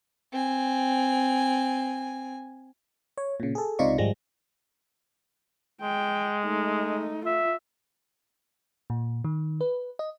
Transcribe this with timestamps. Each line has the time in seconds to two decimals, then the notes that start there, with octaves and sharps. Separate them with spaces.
0.33 C4 G#5
3.18 C#5
3.40 A#2 C#3
3.55 G#4 A4
3.79 C#2 C3 D#4 F4 D5 C#6
3.98 G#1 F3 G3 G#3 A#6
5.81 G#3 G5
6.44 A3 D#4
7.26 F4 E5
8.90 A#2
9.24 D#3
9.61 B4
9.99 D#5